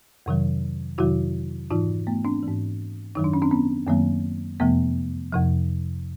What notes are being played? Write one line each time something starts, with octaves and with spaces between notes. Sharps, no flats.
F2 C3 D#3 F#3
F2 C3 D#3 F#3 E4 F#4
G#2 E3 D#4 F4
A3 B3
C4 D4
G#2 E3
F#2 D#3 F#3 D#4
D4
C#4
C4 D4
B3 C#4
F#2 D#3 F#3 A#3 C4
F2 C3 F3 A3 B3
F2 C3 F3